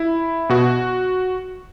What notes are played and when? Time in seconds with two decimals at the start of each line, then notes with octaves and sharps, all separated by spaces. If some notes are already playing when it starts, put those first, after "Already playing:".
Already playing: E4
0.49 B2 F#4